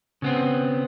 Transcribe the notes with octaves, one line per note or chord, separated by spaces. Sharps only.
C#3 B3 C4